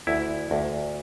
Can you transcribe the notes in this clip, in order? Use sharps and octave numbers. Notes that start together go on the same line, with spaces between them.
D2 E4
D2